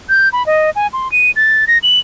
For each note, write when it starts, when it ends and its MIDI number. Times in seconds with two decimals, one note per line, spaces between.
0.09 0.29 91
0.33 0.45 83
0.46 0.70 75
0.76 0.87 80
0.93 1.11 84
1.12 1.31 99
1.36 1.65 93
1.67 1.78 94
1.83 1.99 102